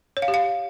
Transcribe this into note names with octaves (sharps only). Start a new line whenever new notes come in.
C#5
F5
G4
F5